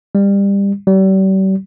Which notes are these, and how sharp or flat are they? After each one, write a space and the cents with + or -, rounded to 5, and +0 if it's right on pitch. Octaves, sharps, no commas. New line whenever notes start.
G3 +25
G3 -40